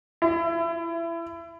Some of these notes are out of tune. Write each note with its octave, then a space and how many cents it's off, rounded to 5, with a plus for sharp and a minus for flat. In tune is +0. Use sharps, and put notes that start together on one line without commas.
E4 +25